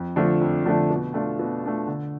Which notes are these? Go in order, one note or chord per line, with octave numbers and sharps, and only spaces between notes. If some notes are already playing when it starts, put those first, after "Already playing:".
Already playing: F2
D3 F3 A3 D4
F2
D3 F3 A3 D4
B2
A3 D4 F4
B2
A3 D4 F4
D3